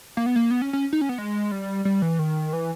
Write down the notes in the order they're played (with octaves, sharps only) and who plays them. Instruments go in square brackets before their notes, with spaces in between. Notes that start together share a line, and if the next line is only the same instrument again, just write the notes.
[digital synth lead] A#3
B3
A#3
B3
C#4
C#4
D#4
C#4
B3
G#3
G3
G3
E3
D#3
E3